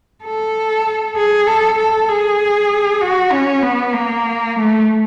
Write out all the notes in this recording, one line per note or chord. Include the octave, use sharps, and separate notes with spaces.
A4
G#4
A4
A4
G#4
F#4
C#4
B3
A#3
A3